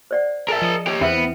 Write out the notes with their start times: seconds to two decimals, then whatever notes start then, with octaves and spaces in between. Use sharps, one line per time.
0.11 C5 D5 F#5
0.48 G#4 A#4 E5 A5
0.62 F3 D#5 D#6 C#7
0.87 G4 C#5
1.01 E2 B3 C4 E4 B4 E5 G5